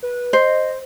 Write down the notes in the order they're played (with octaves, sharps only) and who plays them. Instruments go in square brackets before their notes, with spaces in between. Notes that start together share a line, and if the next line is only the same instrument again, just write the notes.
[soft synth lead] B4
[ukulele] C5 [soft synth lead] D#5